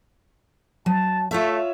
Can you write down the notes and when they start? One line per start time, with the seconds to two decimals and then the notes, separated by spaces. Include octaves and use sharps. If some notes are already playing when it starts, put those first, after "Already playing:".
0.86 F#3 A5
1.31 A3 F4 C#5 E5